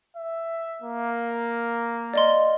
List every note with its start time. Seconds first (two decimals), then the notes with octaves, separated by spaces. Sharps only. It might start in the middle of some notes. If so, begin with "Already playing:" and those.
0.17 E5
0.82 A#3
2.14 D5 D#5 C6